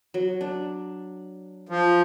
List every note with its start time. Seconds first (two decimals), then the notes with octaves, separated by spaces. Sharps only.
0.14 F#3
0.41 D4
1.69 F3